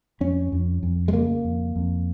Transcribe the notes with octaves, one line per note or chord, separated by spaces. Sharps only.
F2 C#4
F2
F2
G#3
C#3 A#3
F2
F2